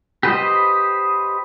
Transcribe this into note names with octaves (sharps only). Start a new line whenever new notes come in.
G4 B4 C5 D#5